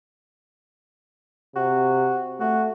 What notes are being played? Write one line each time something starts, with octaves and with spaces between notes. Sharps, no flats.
C3 F#4
A3 F#4